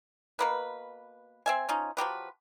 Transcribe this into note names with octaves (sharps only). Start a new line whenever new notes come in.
B2 A#3 B4
C4 E5 G#5
F3 C#4 D#4
F3 F#3 G4 B4